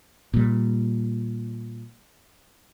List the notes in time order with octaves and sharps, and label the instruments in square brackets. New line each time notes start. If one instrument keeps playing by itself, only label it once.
[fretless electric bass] A#2 G3